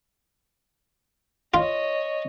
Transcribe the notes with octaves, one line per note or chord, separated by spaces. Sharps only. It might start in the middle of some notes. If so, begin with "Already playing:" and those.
F4 C#5 D#5